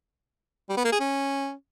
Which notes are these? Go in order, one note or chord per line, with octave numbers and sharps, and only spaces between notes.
G3
B3
A#3
G#4
C#4